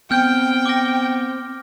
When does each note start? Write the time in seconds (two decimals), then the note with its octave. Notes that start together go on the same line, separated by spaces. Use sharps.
0.11 B3 C4 G5 F6 G6
0.66 D6 G6 A#6